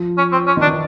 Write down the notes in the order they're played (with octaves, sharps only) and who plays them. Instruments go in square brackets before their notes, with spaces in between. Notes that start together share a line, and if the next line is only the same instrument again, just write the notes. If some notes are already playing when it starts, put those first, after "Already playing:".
Already playing: [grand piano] F3 F4
[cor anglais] C#4
C4
C#4
[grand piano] D#3 D#4 [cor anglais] D4
[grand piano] E3 E4